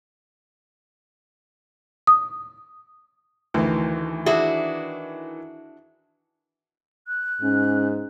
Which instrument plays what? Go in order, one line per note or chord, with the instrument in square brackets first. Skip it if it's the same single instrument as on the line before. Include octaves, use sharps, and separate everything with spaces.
[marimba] D#6
[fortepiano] D2 [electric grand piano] D#3 E3
[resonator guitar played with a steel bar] D4 E4 F#4 [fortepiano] G#4
[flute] F#6
[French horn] G#2 [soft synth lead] C#4